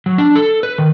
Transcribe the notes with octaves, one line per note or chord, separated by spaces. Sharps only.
F#3
D4
A4
B4
D#3